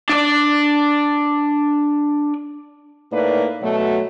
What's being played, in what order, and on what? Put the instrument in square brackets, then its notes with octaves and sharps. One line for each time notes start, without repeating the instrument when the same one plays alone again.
[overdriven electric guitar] D4 D5
[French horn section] A2 A#3 D#4 B4 D5
B2 F#3 A3